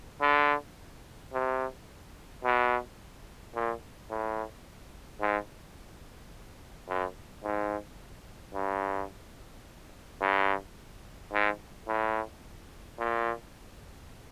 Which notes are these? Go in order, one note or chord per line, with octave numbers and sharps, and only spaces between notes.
D3
C3
B2
A#2
A2
G#2
F#2
G#2
G2
G2
G#2
A2
A#2